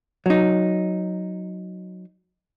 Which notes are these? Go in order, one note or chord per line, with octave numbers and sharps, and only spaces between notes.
F#3 D#4